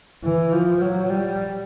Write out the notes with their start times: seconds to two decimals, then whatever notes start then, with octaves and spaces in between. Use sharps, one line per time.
0.25 E3
0.53 F3
0.81 F#3
1.10 G3